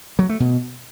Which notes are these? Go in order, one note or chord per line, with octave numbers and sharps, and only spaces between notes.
F#3
A3
B2